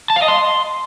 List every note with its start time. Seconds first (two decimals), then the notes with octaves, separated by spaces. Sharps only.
0.10 A5
0.16 F5
0.22 D#5
0.28 C6